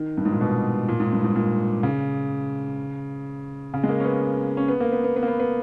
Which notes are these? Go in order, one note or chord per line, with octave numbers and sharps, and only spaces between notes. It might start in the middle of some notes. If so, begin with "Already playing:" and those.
Already playing: D#3
G2
G#2
A#2
B2
A#2
G#2
G2
G#2
A#2
C#3
C#3
G#3
A#3
C#4
B3
C#4
B3
A#3
B3
B3
B3
A#3
B3
B3